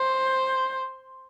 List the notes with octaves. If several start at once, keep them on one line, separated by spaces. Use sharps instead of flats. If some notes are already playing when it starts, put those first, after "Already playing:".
Already playing: C5